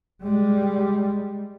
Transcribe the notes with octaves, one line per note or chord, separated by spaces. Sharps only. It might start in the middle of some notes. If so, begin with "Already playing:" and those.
G3 G#3